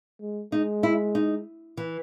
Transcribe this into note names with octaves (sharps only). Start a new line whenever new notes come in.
G#3
G#3 D#4
E4
D#4
E3